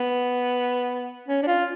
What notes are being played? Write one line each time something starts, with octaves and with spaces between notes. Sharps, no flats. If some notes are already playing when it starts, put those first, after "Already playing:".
Already playing: B3
C#4
D4
F4